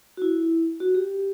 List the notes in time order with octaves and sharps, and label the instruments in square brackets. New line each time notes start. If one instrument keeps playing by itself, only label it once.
[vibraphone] F#4
E4
F#4
G4